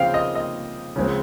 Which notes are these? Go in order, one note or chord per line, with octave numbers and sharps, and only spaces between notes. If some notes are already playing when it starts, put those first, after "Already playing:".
Already playing: C#3 F3 C4 F5 G5
D#5
D#5
C#3 F3 G#3 C4